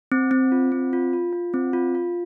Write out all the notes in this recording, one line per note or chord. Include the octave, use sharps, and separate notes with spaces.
C4
C4
F4
C4
F4
F4
F4
C4
F4
F4